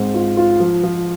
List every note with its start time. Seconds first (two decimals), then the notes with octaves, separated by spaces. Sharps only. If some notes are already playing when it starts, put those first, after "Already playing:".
Already playing: G#2 C4
0.14 F4
0.37 F4
0.60 F3
0.83 F3